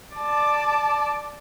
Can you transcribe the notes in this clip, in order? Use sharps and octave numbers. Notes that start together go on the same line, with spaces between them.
D5 A5